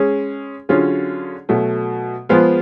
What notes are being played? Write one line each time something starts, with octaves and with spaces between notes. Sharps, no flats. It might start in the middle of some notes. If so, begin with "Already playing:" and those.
Already playing: G#3 C#4 G#4
D3 F#3 C#4 F4 G#4
B2 F#3 A3
F3 G#3 B3 F4 G#4